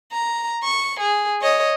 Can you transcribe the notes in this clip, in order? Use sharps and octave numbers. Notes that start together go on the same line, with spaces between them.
A#5
C#6
G#4
C#5 D#5